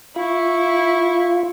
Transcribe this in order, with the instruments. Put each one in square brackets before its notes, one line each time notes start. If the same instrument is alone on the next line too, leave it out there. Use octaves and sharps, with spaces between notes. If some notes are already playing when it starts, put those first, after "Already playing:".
[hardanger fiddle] E4 C#6 [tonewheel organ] F4